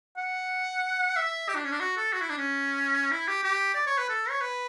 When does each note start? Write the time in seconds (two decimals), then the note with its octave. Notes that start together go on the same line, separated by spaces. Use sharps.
0.17 F#5
1.16 E5
1.48 G4
1.55 D4
1.65 C#4
1.72 D4
1.80 F#4
1.97 A4
2.13 F#4
2.21 E4
2.30 D4
2.37 C#4
3.11 E4
3.28 G4
3.44 G4
3.74 D5
3.87 C#5
3.98 B4
4.09 A4
4.30 C#5
4.41 B4